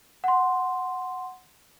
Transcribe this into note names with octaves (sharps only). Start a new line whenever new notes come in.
F#5 C6